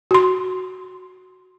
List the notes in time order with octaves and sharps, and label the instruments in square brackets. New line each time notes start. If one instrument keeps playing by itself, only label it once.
[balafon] F#4 C6